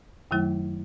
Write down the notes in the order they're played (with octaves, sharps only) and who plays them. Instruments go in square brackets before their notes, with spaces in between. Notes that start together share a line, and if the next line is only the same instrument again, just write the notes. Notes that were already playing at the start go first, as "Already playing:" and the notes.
[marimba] F#2 D#3 F#3 A3 E4